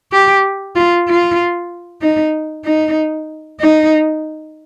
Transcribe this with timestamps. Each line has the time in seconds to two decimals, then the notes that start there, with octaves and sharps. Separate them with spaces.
0.12 G4
0.76 F4
1.08 F4
2.02 D#4
2.65 D#4
3.60 D#4